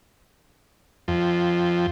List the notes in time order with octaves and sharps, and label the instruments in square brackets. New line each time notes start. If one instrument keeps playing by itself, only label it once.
[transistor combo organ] F2